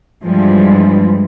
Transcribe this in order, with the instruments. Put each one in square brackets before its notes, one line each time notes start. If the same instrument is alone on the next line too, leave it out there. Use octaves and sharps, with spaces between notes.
[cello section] G2 E3 F3 G3 G#3